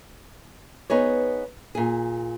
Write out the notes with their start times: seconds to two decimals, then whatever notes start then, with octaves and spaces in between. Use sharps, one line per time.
0.90 B3 D#4 G#4 C#5
1.75 A#2 G#4